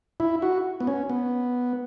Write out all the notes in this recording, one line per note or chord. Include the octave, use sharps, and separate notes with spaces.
E4
F#4
B3
C#4
B3